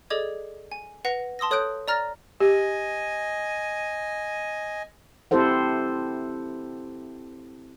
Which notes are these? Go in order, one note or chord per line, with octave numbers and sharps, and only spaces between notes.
G#4 A4 D5 D#5 D6 G#6
G#5
B4 F#5 A#6 C7 F7
A5 C6 D#6 E6 A#6
A4 C#5 D#6 F#6 G6 D7
D5 A#5 F6 A6 A#6
G4 D#5 G#5
C4 E4 G4 A4 C5 F#5